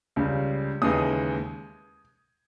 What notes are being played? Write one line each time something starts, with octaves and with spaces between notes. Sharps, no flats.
C#2 C#3 G3
D#2 C#3 E3 G#3 D#4 D#6